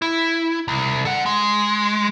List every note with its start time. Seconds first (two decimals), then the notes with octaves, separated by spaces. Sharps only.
0.02 E4
0.68 C2
1.05 A4 F#5
1.26 G#3